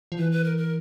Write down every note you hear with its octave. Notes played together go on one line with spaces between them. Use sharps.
F3
E3 B4
B4
A#4
A#4